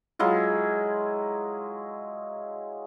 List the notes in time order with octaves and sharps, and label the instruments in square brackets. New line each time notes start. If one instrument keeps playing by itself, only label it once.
[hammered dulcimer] F#3 G#3 E4 F4